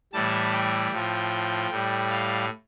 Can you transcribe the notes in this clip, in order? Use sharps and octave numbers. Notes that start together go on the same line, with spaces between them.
A2 E3 G3 A5
G5
A2 F3
A2 G3
F5